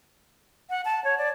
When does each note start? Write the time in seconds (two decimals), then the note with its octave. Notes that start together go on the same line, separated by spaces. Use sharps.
0.70 F#5
0.85 A5
1.04 C#5
1.18 D5